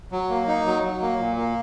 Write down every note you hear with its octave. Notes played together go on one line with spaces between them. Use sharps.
F#3
A#3
D#4
F#3
F#3
A#3
A#2
A#3